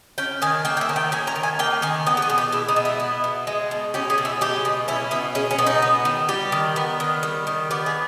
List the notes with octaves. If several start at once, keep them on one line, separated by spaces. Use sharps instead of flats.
C#4 G5
D#3 G#5
A#3 G5
G5
E5
D#3
G5
C#4 G#5
A#5
D#3
G#5
A#3 G5
D#3 G#5
B3 G5
G4
G#4
B2
G4
G#3 E4
D#4
B2
E4
B3
B2
G#3
B2
C#4 G4
G#4
B2
E4
G#3 G4
B2
C#4 E4
B2 E4
G#3 C#4
C#4
B2
D#4
B3
D#3
G3 G4
D#3
B3
D#3
G3
D#3
B3 G4
G#4